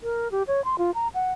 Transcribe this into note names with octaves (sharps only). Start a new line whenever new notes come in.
A#4
G4
C#5
C6
F4
A#5
F#5